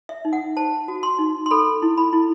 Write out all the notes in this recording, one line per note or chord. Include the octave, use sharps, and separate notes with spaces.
E5
D#4
F#5
C5 A5
F#4
C6
D#4
C6
A4 B5
E4
B5
E4